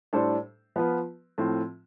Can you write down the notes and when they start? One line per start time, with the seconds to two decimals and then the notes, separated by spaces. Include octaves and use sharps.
0.13 A2 G3 D4 A4 C5
0.76 F3 B3 F4 B4
1.38 A2 F3 C4 F4